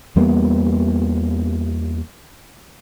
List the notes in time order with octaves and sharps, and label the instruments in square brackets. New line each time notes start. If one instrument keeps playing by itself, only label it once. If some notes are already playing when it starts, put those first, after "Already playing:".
[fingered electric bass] E2 G3 A#3 B3